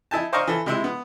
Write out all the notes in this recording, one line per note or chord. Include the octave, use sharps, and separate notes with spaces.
D#4 E4 G#5 A5
C5 D5 D#5 F5 A#5 C#6
E3 A4
C3 G#3 E4
B3